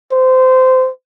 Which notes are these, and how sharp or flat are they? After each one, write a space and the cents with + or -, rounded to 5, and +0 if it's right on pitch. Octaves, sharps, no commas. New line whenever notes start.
C5 -20